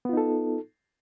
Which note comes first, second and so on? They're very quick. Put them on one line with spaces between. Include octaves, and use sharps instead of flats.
B3 F4 D#4 A4